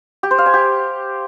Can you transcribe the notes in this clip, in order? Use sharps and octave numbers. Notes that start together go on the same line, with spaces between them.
G4
C5
F5
G#5
G4